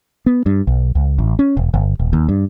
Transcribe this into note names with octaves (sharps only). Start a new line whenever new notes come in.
B3
G2
B1
C#2
A1
C#4
E1
G1
D#1
D#2
G2